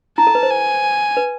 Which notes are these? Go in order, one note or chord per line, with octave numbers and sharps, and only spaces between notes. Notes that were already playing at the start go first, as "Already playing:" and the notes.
E4 A5
A4
B4
C5
G#5
B4